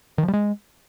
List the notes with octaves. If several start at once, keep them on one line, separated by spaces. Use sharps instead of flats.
D#3
F3
G3
G#3